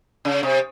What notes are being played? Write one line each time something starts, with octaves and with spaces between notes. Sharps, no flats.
C#3
C3